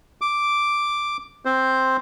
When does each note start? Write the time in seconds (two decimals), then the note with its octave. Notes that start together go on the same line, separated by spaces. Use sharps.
0.21 D6
1.45 C4 C5